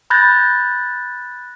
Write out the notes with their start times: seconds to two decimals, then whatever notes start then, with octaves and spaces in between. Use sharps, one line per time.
0.10 B5 F#6 G6 A6 A#6